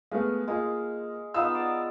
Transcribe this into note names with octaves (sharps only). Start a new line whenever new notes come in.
G#3 A3 B3 F5
G#3 A#3 F4
B3 D#4 F4 F5 D#6 E6
D5